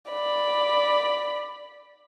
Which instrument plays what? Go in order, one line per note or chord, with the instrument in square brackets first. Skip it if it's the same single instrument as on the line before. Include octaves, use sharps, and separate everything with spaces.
[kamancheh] D5 B5